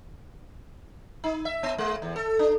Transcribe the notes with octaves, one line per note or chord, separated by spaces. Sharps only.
D#4
E5
B3
G#3
E2
A4
D4